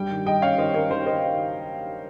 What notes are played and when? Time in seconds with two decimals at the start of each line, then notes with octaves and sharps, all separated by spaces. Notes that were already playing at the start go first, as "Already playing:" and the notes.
Already playing: G2 G3 G5
0.10 D#3
0.26 G3 D#5 G5
0.42 C#4 C#5 F5
0.58 D#3 C5 D#5
0.74 C#4 A#4 C#5
0.91 D#3 C5
1.06 D#3 C5 D#5